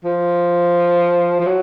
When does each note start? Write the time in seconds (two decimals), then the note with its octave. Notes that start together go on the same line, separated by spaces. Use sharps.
0.05 F3
1.40 F3
1.46 F#3